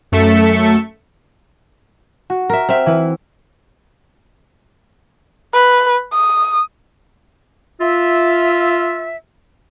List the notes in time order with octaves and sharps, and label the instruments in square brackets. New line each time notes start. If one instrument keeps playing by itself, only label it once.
[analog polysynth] F#2 A3 A4 E5 C#7
[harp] F#4
[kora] A#4 E5
[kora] C4 E5 [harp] F6
[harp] E3 E4 B4
[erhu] B4
D#6
[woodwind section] F4 E5